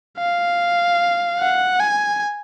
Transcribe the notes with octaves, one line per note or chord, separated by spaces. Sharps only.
F5
F#5
G#5